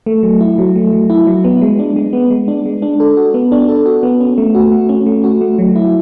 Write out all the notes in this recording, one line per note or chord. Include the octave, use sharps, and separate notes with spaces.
A3
F#3
E4
F#3
A3
F#3
E4
F#3
B3
G#3
D4
G#3
B3
G#3
D4
G#3
D4
A4
F#4
B3
D4
A4
F#4
B3
C#4
A3
F#4
A3
C#4
A3
F#4
A3
F#3
E4